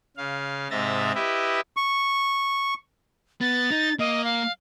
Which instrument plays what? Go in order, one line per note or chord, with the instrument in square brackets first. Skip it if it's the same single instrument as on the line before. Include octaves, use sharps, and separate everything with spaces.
[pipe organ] C#3 F5
G#2 C3 D#5 E5 A#5 A6
E4 G4 B4 D#5 E5
[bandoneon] C#6
[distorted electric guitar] B3 [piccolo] A6
[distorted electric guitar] D#4
[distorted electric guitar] A#3 [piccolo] D#5
[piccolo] F5